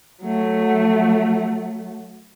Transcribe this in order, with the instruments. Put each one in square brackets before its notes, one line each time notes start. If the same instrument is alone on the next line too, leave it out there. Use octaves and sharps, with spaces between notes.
[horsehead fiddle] F#3 A3